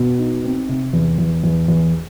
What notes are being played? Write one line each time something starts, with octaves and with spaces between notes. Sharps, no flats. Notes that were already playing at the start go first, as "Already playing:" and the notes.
Already playing: B2
D#4
C4
C3
E2
E2
E2
E2